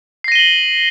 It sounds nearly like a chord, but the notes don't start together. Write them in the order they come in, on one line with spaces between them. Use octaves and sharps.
C7 A#6 D#7 G7 F#7